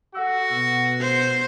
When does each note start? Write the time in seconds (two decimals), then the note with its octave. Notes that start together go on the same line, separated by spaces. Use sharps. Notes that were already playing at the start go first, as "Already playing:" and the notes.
0.15 F#4 A4 F#5 E6
0.51 B2
1.01 C5